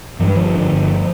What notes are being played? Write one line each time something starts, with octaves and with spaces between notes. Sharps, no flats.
G2 F3
G3
G1 F3
D3
G1